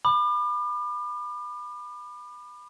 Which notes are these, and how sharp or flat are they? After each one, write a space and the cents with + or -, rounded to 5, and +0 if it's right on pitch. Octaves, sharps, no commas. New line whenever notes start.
B5 +0 D6 +40